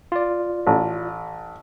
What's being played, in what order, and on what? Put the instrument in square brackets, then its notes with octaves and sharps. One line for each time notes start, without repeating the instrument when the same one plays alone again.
[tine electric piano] F4 D5
[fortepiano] A1